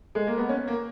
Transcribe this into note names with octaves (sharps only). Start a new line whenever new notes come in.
G#3
A#3
B3
C#4
A#3